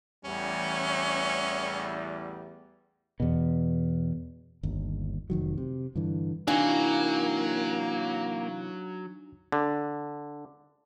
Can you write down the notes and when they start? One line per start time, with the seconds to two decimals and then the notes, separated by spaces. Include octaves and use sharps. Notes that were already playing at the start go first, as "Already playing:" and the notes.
0.24 A1 E2 G3 C#4
3.20 E2 B2
4.63 G1 D#2
5.30 F1 D#3 F#3
5.58 C3
5.95 G2 D3 E3
6.48 C3 E3 F#3 A#3 D4 D#4 G#5
9.52 D3